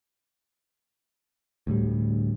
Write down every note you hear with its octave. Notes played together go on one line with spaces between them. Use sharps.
D2 A2 G3